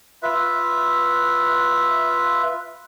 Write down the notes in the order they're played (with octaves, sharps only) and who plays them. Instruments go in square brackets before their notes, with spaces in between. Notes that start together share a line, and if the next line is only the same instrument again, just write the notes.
[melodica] F4 B4 E5